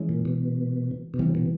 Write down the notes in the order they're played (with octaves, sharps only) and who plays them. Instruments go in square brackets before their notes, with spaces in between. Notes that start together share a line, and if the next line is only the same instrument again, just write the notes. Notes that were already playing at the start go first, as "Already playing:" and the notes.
Already playing: [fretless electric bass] E3 G#3 C#4
[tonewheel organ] A#2
B2
B2
[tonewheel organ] C3 [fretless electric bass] E3 G3 B3
[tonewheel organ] B2